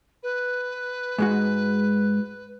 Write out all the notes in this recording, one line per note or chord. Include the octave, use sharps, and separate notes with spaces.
B4
G#2 G#3 F#4